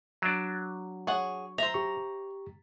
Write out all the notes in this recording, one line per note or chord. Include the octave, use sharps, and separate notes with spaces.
F#3 D4
G#4 C#5 F#5 C#6
C5 E5 A#5
G4 C#6